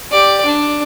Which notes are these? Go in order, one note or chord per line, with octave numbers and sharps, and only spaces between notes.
G4 D5
D4